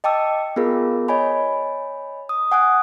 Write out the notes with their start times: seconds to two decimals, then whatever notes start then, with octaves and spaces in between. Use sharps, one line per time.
0.04 D#5 G5 A5 D6 E6
0.56 B3 F4 G#4 A#4
1.08 C#5 D#5 G#5 B5
2.29 D#6
2.52 F#5 G#5 D#6 F#6